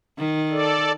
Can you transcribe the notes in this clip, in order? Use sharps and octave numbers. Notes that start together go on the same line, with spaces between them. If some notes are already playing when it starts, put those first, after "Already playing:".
D#3
A4 D5